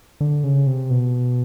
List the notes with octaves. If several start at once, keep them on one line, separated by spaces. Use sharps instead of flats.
D3
C#3
C3
B2